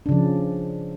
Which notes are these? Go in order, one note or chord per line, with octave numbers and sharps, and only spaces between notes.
C#3 F3 D4